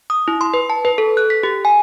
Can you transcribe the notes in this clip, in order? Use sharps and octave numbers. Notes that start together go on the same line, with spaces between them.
D#6
E4
C6
B4
A5
B4
A4
F#6
B6
G4
G#5